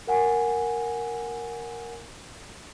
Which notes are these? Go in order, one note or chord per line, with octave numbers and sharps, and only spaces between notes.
A#4 F#5 G#5